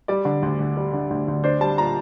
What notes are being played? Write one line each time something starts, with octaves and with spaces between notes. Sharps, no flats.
G3 D5
D3
D2
D2
G3
D3
D2
D2
D4 C5
G3 A5
A#2 A#5